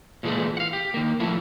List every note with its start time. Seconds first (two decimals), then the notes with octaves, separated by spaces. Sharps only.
0.23 A#2 E3 G#3 A3
0.57 F5 F#5
0.73 G4
0.94 D#3 A#3
1.20 F3 A3 E4